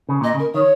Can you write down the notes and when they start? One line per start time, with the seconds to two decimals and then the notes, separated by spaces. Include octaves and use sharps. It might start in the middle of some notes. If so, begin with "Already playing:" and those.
0.09 C#3
0.21 A#2 D#5
0.34 C#3
0.39 A#4
0.54 D#3 C#5